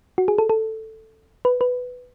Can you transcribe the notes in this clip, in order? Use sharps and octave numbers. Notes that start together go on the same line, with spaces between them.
F#4
G#4
A4
A4
B4
B4